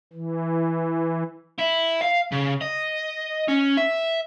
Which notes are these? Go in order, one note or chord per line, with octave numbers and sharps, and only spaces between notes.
E3
E4
F5
C#3
D#5
C#4
E5